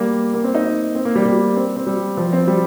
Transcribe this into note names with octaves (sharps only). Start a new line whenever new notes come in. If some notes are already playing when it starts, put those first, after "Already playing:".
Already playing: G3 A#3
A#3
C4
D#4
C4
A#3
G3
G3
C4
C4
G3
F3
C4
G3